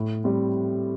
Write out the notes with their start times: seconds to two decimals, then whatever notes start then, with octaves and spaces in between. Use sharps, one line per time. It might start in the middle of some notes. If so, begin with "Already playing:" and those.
Already playing: A2
0.24 G3 C4